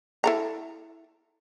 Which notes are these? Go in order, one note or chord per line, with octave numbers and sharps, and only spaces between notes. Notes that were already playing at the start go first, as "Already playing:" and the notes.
E4 A4 A#5